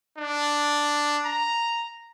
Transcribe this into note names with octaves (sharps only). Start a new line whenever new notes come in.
D4
A#5